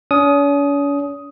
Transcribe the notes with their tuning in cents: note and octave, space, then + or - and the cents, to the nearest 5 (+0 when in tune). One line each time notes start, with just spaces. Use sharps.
C#4 +45 D#6 +5